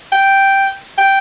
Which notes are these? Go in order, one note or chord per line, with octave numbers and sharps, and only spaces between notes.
G5
G5